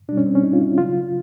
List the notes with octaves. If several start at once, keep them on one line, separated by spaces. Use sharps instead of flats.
B2 G3 D4
C#4
C4
C#4
D#4
F4
E4
C#3 F#3 F4